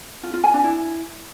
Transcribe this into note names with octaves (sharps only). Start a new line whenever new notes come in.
F4
F4
G#5
D4
E4